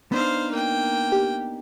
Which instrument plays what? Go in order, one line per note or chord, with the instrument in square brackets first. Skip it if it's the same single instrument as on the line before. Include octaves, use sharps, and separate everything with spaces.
[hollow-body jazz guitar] B3 D4 D#4 [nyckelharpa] C5 F5
[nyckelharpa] A#3 G5
[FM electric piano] G4